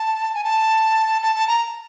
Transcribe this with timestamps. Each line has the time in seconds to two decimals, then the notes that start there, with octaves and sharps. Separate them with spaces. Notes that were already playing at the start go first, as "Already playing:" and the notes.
Already playing: A5
0.35 G#5
0.44 A5
1.22 A5
1.36 A5
1.48 A#5